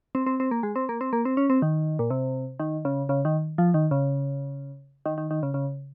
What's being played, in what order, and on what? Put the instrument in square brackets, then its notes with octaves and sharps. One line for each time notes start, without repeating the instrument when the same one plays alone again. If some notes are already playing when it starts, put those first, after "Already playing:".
[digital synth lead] C4
C4
C4
A#3
G#3
C4
A#3
C4
A#3
C4
C#4
C4
D#3
A#2
C3
D#3
C#3
C#3
D#3
F3
D#3
C#3
D#3
D#3
D#3
C#3
C#3